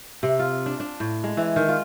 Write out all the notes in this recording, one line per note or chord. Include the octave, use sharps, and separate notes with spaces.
C3
F4
D4
D4
A2
G#3
E3
D#3
F4